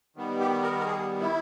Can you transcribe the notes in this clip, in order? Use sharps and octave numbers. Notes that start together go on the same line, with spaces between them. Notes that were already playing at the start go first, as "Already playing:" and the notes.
D#3 G3 B3
G4
A#4
A#4
G#4
E4